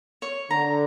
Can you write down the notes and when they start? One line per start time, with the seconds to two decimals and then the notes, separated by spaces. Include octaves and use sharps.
0.22 C#5
0.50 D3 A#5